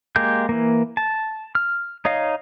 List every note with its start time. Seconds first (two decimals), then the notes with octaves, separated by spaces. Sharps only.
0.16 G#3 A#3 G4 G6
0.49 E3 A#3
0.97 A5
1.55 F6
2.05 D#4 C#5 D#5 F5